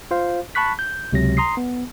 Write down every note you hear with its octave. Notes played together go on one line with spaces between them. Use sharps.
F4 C5 F5
A5 B5 C#6 F#6 B6
G6
C#2 C3 F#3 A#6
A#5 C6 D#6 C7
B3